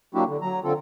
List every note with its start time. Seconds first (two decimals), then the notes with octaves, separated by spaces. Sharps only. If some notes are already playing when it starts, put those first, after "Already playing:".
0.15 F#3 A#3 D4 E4 F#4 G4
0.27 D3
0.42 F#3 A#5
0.64 D3 C4 F4 A4